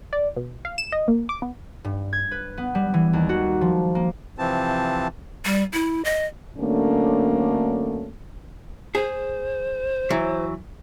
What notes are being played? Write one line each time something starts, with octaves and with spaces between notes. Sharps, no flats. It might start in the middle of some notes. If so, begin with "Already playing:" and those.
D5
B2
F5
E7
D#5
A#3
D6
B3
G2
G#6
B4
B3
G3
E3
D#2
F#4
F3
A#3
C3 E3 F3 C4 A5
G3
E4
D#5
D3 F#3 A3 A#3 C#4 D4
G#4 C5
E3 F#3